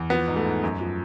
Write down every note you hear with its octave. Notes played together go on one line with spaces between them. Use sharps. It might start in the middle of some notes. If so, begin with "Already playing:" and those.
Already playing: E2
F3 B3
G#2
A3
G#2
F#2
F3